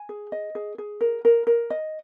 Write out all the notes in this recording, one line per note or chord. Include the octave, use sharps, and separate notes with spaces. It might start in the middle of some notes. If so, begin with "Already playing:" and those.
Already playing: G#5
G#4
D#5
G#4
G#4
A#4
A#4
A#4
D#5